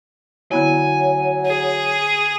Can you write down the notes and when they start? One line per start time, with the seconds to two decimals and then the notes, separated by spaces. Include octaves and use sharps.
0.52 D3 F#3 B3 E4 G#5
1.46 G#4